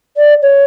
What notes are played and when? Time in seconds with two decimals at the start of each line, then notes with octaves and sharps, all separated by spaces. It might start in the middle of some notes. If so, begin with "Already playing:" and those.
0.17 D5
0.42 C#5